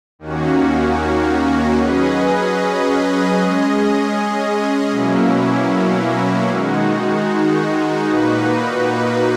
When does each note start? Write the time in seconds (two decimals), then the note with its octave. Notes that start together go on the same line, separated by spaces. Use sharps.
0.19 D#2 D#3 A#3 C#4 F#4
1.75 F#3 C#4 G#4 B4 D#5
3.33 G#3 C#4 G#4 D#5
4.90 B2 F#3 A#3 C#4 E4
6.47 D#3 G#3 D#4 F#4
8.04 A#2 A#3 D#4 F#4 B4